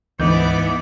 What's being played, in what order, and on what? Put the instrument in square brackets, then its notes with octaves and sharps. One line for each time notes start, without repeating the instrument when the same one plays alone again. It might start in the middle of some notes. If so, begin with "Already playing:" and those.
[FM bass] D2 [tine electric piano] G#2 D#5 G6 [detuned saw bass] E3 [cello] B3 D5